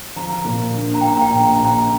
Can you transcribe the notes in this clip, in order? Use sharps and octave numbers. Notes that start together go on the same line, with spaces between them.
F3 A#5
A#2
D4
A#5
A#1 G5
A#5
G5
A#1
A#5
A#1
A#5